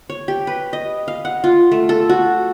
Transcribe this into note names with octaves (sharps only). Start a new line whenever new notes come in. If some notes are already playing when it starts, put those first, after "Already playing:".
C#5
G4
B4
D#5
F5
F#5
F4
A3
A4
F#4